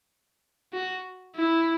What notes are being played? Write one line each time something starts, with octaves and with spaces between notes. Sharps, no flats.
F#4
E4